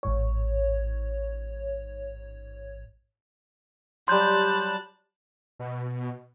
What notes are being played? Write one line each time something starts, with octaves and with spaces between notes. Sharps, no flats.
A1 G#2 C#5
F#3 G3 A5 C6 F#6 G6
B2